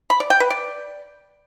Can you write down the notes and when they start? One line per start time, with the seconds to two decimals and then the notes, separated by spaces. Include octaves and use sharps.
0.10 B5
0.20 D5
0.30 G5
0.40 B4
0.50 D5